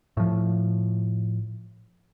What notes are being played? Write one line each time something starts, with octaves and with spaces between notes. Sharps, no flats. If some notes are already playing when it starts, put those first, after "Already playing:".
A2 F3